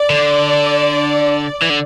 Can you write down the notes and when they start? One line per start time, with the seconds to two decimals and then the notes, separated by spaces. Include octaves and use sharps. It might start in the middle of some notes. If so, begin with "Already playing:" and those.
Already playing: D5
0.10 D3
1.62 E3
1.69 D3